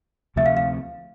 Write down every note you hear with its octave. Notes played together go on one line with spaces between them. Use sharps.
D2 C3 F3 A3 E5
F5
F5